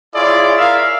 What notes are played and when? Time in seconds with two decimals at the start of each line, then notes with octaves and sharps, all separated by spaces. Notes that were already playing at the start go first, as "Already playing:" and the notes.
0.14 E4 F4 G#4 C#5 D5
0.57 E4 A#4 E5 F5